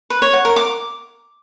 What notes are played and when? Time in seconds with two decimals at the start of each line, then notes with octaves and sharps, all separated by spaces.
0.10 B4
0.22 C#5
0.33 F#5
0.45 A#4
0.56 D6